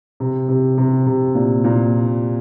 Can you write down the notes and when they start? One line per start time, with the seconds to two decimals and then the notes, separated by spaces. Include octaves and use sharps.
0.20 C3
0.49 C3
0.78 C3
1.06 C3
1.35 A#2
1.64 A#2